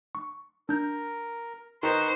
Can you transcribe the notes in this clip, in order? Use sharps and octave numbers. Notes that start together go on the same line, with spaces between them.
C#6
D4 A#4 G6
D#3 B4 C5 A#5 C#6